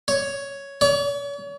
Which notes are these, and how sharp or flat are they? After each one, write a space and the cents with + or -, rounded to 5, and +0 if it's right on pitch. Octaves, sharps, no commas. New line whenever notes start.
C#5 +5
C#5 +40